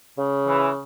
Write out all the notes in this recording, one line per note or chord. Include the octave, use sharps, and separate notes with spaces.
C#3
E3